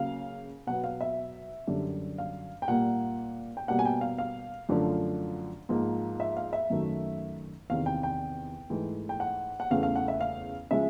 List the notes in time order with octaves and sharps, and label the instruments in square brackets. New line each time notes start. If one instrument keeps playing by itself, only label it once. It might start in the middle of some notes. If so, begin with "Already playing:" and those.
Already playing: [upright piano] C#3 F#3 A#3 F5
B2 F#3 B3 F#5
F5
E5
F#2 D3 G3
F5
G5
A#2 G3 A#3 F#5
G5
B2 G3 A#3 F#5
G#5
G5
F5
F5
F#2 D3 F3 A3
G#2 F3 A#3
E5
F5
E5
F#2 D#3 F#3 A3
E2 C3 D#3 F5
G5
G5
G#2 E3 A3
G5
F#5
F#5
E2 C#3 E3 A3 F5
F5
F#5
E5
F5
C#3 F3 G#3 E5